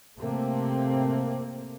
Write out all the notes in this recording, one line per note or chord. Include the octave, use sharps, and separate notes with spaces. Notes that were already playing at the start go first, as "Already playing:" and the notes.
C3 A3 A#3 C4